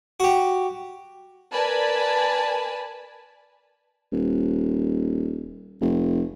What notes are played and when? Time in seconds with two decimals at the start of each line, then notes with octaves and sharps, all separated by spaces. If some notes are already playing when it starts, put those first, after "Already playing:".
0.20 F#4 G4
1.52 A#4 B4 D5 G#5 A5 B5
4.12 D#1
5.81 F1